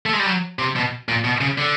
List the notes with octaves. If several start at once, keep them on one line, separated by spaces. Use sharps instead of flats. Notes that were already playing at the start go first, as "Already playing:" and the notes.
A3
G#3
G3
F#3
C3
B2
A#2
B2
C#3
D3